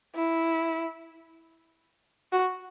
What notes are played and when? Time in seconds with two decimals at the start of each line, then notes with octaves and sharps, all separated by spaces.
0.15 E4
2.32 F#4